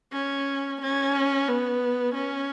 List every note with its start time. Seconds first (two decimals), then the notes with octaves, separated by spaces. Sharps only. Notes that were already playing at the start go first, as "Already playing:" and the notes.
0.13 C#4
0.81 C#4
1.48 B3
2.15 C#4